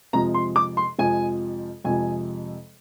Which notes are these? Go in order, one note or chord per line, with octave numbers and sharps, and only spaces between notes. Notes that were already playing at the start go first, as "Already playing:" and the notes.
F2 C3 F3 G#3 A#5
C6
D6
C6
F2 C3 F3 G#3 G#5
F2 C3 F3 G#3 G#5